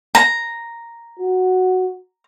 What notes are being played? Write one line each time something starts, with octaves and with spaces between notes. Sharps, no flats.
A#5
F#4